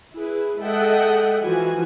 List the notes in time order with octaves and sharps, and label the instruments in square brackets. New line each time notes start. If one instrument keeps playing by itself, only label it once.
[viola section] E4 G#4 B4
G#3 A4 D#5 E5 F#5 G5
E3 F3 F#4 G#5